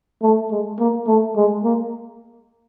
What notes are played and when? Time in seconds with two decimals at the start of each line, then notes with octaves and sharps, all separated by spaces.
0.22 A3
0.51 G#3
0.79 A#3
1.07 A3
1.36 G#3
1.64 A#3